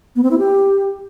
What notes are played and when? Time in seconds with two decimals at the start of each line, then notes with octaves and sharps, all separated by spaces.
0.16 B3
0.23 C4
0.31 E4
0.38 G4